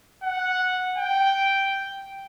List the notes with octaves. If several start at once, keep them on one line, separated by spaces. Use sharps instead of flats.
F#5
G5